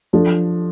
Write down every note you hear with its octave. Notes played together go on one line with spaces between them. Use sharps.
F3 D4 A4